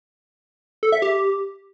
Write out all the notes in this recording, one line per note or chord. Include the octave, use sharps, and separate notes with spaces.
A4
E5
G4